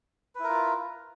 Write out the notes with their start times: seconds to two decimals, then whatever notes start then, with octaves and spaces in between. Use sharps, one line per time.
0.35 B4
0.40 E4
0.44 A#4
0.48 F4